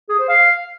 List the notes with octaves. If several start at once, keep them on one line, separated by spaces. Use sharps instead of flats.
G#4
C5
F5